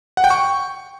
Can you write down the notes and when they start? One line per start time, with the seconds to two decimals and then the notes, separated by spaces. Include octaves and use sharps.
0.17 F#5
0.24 G5
0.30 C#6